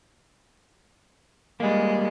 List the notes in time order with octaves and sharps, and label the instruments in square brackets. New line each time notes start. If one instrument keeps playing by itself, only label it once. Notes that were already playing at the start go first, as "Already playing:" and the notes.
[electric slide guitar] G3 A#3 [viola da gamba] G#3